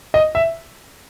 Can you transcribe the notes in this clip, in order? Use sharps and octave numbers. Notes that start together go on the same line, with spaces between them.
D#5
E5